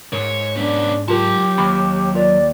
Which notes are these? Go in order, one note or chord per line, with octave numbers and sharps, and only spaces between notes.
G#2 A#4 C#5
B3 C#4 D4
F#3 F4 G4 A#4 A5
D#2 B5 C#6
F4 A#4 D5